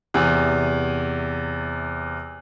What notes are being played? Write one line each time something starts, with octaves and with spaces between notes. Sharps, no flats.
E2 C3